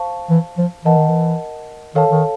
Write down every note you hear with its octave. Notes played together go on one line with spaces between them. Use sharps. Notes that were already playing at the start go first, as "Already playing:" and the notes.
Already playing: C5 F5 A5 C#6
E3
F3
E3 A#4 D#5 F#5 A5
D#3
E3
D#3 A4 C#5 F5 A5
D#3